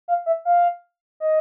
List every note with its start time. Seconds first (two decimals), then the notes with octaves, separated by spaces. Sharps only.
0.08 F5
0.26 E5
0.45 F5
1.20 D#5